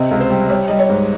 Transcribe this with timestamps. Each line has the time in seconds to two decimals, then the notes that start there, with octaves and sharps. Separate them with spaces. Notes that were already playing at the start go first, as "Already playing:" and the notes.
Already playing: C3 D#5
0.11 C#2
0.20 C5
0.30 G3
0.49 G3 C#5
0.68 G3 D#5
0.79 C#5
0.89 G#2